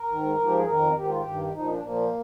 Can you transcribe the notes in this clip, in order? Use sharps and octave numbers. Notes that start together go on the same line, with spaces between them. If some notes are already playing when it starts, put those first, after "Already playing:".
Already playing: A#4
G#2 D#3
G#2 F3
G4
G#4
F2 D#3 A#4
G#2 D#3 G4
F4
G4
G2 D#3
A#2 F3 D#4
D4
A#2 F3 A#3